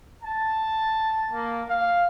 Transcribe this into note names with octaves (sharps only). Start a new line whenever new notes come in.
A5
A#3
F5